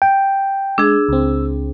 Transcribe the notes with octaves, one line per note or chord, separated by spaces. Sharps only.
G5
G#3 D4 G#4 E6
C#2 C4